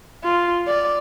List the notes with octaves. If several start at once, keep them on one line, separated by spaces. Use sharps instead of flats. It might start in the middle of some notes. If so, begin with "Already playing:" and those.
F4
D5